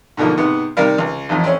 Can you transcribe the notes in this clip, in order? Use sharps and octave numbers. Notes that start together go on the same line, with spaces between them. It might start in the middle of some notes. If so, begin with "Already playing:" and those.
G#2 B2 D3 F3 A#3
G#2 C3 B3
C3 D#3 G3 A#4 F5
C#2
A1 F2 A2
C4 C#4